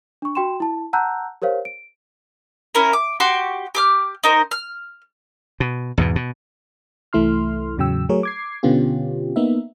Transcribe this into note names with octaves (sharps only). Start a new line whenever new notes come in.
D4 C#6
F#4 G5 C6 E7
E4 A5
F#5 A5 A#5 E6 F#6 G6
G4 A#4 C5 C#5 F5
D7
C#4 E4 A#4
D6
F#4 G4 C6 C#6
G4 D6 F6
D#4 A#4 C5
F6
B2
E2 G#2 B2
B2
C2 E3 A3 E4 C6 F6
E2 A2 C#3 F#3 G5 E6
F#3 A3 G#4 A#4 C#5
D6 G#6 C7
B2 D3 B3 C#4 F4 G4
A#3 B3 D#4 E5